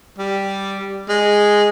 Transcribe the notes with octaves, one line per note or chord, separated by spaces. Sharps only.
G3
G#3